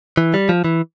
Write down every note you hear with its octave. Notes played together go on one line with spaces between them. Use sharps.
E3
G3
F3
E3